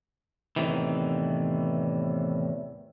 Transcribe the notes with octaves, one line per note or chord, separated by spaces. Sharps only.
E2 A2 C3 D#3 E3